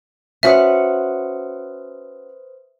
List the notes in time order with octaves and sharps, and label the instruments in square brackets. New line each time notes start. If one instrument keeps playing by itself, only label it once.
[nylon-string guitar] C#4 F#4 [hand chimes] B4 C5 D#6 [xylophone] E5